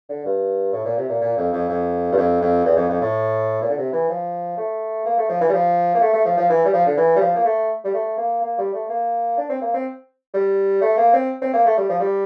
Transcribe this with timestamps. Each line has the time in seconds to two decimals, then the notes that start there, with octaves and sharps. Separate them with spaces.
0.09 D3
0.25 G2
0.73 A2
0.85 A#2
0.98 C3
1.09 A#2
1.21 A#2
1.37 F2
1.53 F2
1.69 F2
2.12 G2
2.17 F2
2.41 F2
2.65 E2
2.77 F2
2.89 F2
3.01 A2
3.62 A#2
3.70 D3
3.78 C3
3.93 E3
4.10 F3
4.57 A3
5.05 A#3
5.18 A3
5.29 F3
5.41 E3
5.49 G3
5.53 F3
5.95 A#3
6.02 A3
6.14 A3
6.25 F3
6.38 F3
6.50 E3
6.65 G3
6.74 F3
6.87 D3
6.97 E3
7.16 G3
7.21 F3
7.36 A#3
7.45 A3
7.84 G3
7.94 A3
8.18 A#3
8.42 A#3
8.58 G3
8.74 A3
8.89 A#3
9.37 D4
9.50 C4
9.61 A#3
9.74 C4
10.34 G3
10.81 A3
10.97 A#3
11.14 C4
11.42 C4
11.54 A#3
11.66 A3
11.77 G3
11.89 F3
12.00 G3